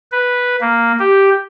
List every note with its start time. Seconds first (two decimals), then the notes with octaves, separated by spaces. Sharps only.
0.12 B4
0.61 A#3
1.00 G4